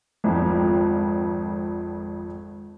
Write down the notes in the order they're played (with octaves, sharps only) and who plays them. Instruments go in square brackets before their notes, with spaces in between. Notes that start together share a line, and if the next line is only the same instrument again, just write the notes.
[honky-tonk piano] G#1 F2 F3